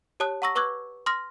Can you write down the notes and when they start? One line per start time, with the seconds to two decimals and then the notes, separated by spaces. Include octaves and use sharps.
0.20 G4 C#5 A5 D#6 F#6
0.42 F#5 A#5 C#6 E6 A#6
0.55 B4 C#6 D6 E6 F#6 G#6
1.06 C6 D#6 F6 A#6